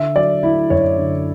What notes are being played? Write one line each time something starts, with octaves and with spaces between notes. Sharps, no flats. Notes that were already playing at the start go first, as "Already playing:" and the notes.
Already playing: D3 E5
F#3 D5
A3 E4
F#2 C#5
D3